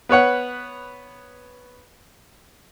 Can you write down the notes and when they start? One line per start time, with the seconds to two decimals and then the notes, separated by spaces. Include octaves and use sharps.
0.09 B3 B4 C#5 F#5